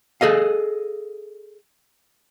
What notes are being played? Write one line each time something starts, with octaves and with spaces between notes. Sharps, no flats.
G#4 A4 D#5 F5